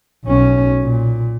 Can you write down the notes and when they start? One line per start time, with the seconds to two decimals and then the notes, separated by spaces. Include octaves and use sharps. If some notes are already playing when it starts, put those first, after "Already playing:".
0.25 B1 C#4
0.84 A#2